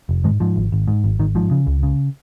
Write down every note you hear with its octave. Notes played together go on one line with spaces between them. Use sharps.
F1
G#2 D#3 G#3
G#2 F3
G#1
G#1
G#2
G#1
G#1 D#3
G#2 F3
C#3
C#2
C#3